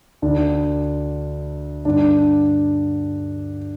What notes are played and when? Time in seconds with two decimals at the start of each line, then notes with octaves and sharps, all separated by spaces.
0.22 D2 D3 D4
1.85 G2 D3 D4